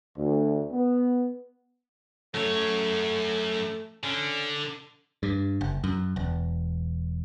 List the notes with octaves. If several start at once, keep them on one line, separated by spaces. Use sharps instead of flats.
D2
B3
F#2 A3 C#5
D3 C#4
G2
F#1
F#2
E1